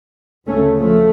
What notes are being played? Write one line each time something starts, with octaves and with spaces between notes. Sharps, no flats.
D2 C#3 A3 C#4
F3 A3